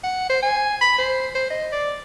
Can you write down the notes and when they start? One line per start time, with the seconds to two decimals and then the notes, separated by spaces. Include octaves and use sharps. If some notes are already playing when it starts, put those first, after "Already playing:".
0.03 F#5
0.30 C5
0.43 G#5
0.81 B5
0.98 C5
1.35 C5
1.50 D#5
1.72 D5